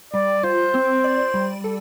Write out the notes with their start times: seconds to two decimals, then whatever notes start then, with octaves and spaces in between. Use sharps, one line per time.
0.13 G3 D5
0.43 F4 C5
0.74 C4
1.04 D5
1.34 G3
1.64 A4